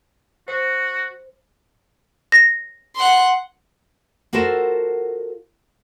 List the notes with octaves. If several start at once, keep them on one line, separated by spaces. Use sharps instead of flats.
F#4 C5
A#6
F#5 C6
F4 F#4 A4 A#4 C5